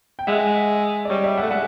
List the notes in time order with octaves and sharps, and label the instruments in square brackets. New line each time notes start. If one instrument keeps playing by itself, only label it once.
[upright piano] G5
[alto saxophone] G#3 [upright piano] E5 F#5
[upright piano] D5
[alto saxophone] G3 [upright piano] C#5 D#5
[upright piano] D5 E5
E5 F#5
[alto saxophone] A3
[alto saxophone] G#3 [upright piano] E5 F#5